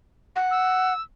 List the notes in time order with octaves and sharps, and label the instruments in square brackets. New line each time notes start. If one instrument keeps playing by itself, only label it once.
[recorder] F#5
[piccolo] E6